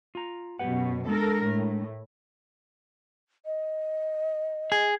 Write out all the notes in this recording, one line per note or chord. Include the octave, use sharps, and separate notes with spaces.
F4 A#5
F#2 B2 G4 B4 F#5
G#3 D4 A4 A#4
A2
D#5
G#4